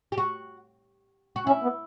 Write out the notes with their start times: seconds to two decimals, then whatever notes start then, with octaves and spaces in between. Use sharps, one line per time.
0.12 G4
0.18 F#4
1.36 F#4
1.47 C#4 E4
1.63 B3